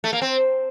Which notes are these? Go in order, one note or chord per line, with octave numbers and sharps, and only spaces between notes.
A3
A#3
C4